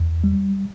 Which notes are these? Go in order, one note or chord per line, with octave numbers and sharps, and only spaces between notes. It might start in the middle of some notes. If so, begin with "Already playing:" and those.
Already playing: E2
G3